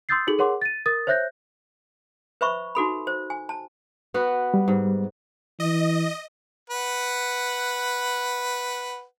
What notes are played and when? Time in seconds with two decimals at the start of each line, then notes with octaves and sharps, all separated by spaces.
0.09 C6 D#6 E6 G6 A6 C7
0.27 D#4 F#4 G#4 A4 F#7
0.38 G#4 A#4 C#5 F#5 C6 D6
0.61 A6 D#7
0.86 A#4 D#6 A6
1.07 C5 C#5 E5 F#6 G6 A#6
2.41 B4 C5 E5 B5 C#6
2.75 D#4 F#4 A4 B5
3.07 C5
3.30 G#5
3.49 A5
4.14 B3 F#4 B4
4.54 G3
4.68 G#2
5.60 E3 D#5
6.70 B4 F#5